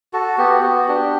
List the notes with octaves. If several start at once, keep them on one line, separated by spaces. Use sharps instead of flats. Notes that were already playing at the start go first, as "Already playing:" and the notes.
F#4 A4
B3 G4
B3 F#4
D4 G4